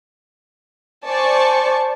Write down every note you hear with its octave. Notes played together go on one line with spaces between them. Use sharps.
C5 D5 G#5 A5 C#6